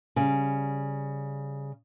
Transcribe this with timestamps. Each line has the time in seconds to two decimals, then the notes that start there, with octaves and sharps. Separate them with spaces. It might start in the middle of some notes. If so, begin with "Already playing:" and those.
0.16 C#3 G3